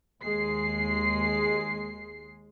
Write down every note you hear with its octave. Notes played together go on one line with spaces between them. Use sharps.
D#2 G#3 C7